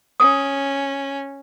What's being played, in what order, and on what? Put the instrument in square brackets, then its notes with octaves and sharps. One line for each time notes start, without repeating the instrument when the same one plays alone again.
[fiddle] C#4 [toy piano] D#6